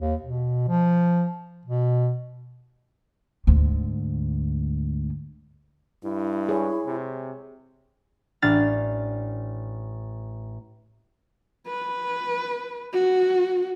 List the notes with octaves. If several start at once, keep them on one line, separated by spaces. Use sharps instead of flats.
D#2
B2
F3
B2
D2 G#2
G2 E4
G#4 C#5
C3
A1 D4 F6 A6
B4
F#4